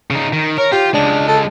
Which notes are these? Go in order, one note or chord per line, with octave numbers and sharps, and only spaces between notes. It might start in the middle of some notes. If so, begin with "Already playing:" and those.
C#3 D#4
D#3
A#4 C#5
F4 G4
C#2 G#3 D4
A4